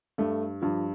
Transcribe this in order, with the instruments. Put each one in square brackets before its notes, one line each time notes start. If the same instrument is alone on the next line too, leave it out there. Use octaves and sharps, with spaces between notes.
[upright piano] G2 [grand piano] A3
[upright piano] G2 [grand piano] F3